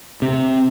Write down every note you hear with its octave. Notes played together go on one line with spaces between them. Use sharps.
C3